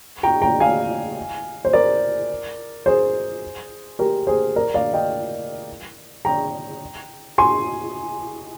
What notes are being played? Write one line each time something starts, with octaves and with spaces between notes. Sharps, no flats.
G5 A#5
G5 A#5
F5 G#5
C5
A#4 D5
G#4 C5
G4 A#4
G#4 C5
A#4 D5
D5 F5
D#5 G5
G5 A#5
G#5 C6